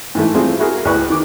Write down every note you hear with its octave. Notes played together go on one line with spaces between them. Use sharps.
G#2 E3 A3
G3 A3 C4 F4 G#4
E4 F#4 G#4 A#4
D2 A2 G#4 B4 C#6 F#6
D#3 D6